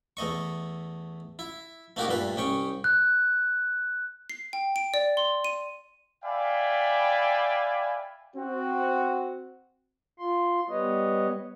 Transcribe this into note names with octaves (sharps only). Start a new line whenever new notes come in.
E2 A3 D#5 C#6
E4
A3 A#3 D#4 F#4 G4 A#4
G2 A#2 A3 B4
C2 C#4 G5 C#6
F#6
C7
G5
D7
D5
C6
D#7
D5 E5 F5 G5 G#5 B5
C4 F#4
F4 C6
G3 B3 B4 C#5 D#5